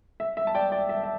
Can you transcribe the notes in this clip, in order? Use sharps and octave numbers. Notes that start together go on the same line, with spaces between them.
E5
E5
A5
D5 G5
D5 G5
E5
E5